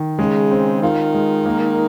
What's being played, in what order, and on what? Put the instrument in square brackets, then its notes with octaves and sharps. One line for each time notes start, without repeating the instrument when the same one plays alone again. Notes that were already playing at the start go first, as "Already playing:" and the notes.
Already playing: [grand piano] D#3
[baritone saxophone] C#3 [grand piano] G#3
[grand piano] C4
[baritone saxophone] D#3 [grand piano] F4
[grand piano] G#3
A#3